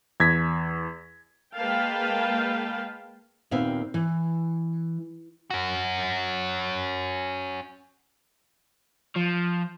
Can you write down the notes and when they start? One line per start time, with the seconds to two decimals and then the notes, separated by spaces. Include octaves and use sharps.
0.20 E2 G#6 A#6 B6
1.54 G#3 A#3 B4 F5 G5 A5
3.51 D#2 A#2 B3 C4 E5 F5
3.94 E3
5.51 C#4 F#4
9.16 F3